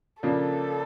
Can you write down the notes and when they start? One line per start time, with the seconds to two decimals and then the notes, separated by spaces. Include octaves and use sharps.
0.23 C#3 F3 A#3 D4 A4